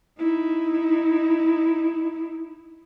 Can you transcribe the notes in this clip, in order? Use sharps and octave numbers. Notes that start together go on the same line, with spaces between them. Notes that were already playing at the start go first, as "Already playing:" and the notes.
D#4 E4